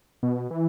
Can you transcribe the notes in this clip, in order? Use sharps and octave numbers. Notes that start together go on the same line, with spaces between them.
B2
E3